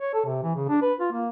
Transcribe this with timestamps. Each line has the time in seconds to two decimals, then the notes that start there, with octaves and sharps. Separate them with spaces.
0.02 C#5
0.14 A4
0.26 C3
0.43 E3
0.55 C#3
0.69 D4
0.82 B4
1.00 F4
1.13 A#3